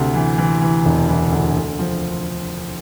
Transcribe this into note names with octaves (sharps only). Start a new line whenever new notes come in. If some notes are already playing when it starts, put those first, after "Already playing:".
Already playing: D2 C3
E3
E3
E3
E1
E3
D2
D2
F3